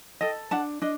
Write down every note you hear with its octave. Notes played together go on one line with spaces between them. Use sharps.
A4 D#5 G5
D4 F#5 A5
D4 D#5